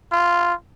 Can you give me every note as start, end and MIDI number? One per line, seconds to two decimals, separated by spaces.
0.12 0.54 65